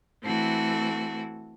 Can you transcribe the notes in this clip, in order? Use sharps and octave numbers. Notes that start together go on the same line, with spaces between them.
E3 A3 C4 F#4 A4